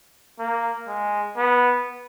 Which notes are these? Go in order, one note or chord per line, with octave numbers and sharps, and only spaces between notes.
A#3
G#3
B3